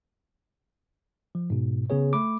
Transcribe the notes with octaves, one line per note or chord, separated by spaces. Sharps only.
F3
G#2 B2
C#3 B3 G#4 C#5
A3 B5 D6